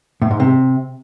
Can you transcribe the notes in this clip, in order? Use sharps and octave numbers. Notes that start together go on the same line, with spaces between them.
A2
G#2
C3